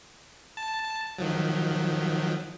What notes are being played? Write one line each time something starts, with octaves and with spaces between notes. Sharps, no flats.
A5
D#3 F3 F#3